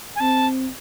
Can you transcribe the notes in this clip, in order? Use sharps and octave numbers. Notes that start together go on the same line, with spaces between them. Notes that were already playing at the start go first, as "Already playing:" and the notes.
G#5
C4 A5